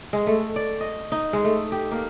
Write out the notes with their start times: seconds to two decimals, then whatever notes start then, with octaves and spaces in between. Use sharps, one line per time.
0.13 G#3
0.27 A3
0.56 D5
0.81 D#5
1.12 D#4
1.33 G#3
1.44 A3
1.72 G4
1.92 A#3